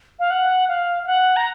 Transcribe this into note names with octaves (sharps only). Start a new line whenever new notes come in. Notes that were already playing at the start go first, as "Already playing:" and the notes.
F5
F#5
F5
F5
F#5
A#5